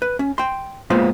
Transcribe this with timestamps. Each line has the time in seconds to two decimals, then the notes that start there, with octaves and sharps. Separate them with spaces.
0.02 B4
0.19 C#4
0.38 G5 C6
0.90 G#3 A#3 B3 F4 C5 F5